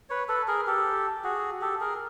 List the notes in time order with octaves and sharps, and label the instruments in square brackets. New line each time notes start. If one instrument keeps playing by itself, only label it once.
[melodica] B4 C#5
A4 B4
G#4 A#4
G4 A4
F#4 G#4
G4 A4
G#4 A#4